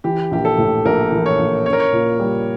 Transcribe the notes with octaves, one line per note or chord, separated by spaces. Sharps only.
E3 G4
A#1 G4
A4
A2
A#1 A#4
E3
C#5
A#1
C#4 C#5
A#4
C#5
A#2
G3